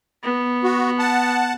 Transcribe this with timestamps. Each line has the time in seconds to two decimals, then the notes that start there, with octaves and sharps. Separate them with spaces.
0.23 B3
0.64 F#4
0.99 F#5 A5